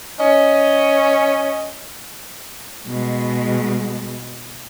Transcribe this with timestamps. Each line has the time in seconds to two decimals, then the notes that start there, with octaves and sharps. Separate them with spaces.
0.20 C#4 D#5
2.87 B2 G#3